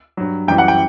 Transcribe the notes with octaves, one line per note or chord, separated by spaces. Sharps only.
G2 F#3
F#2 E3 G3 G5
F#5
G5